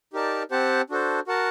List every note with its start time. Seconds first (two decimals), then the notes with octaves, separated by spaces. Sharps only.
0.13 D#4 G4 A#4 D5 A5
0.51 C4 G4 C5 F#5 A5
0.90 D4 F#4 A4 C5
1.27 F#4 A#4 F#5 A5